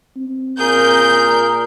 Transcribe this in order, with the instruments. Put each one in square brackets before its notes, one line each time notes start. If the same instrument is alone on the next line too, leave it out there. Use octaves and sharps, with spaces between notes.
[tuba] C4
[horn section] A#2 G#4 A#4 [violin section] G6